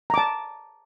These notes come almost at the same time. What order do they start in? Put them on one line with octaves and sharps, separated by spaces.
A#5 D6 A5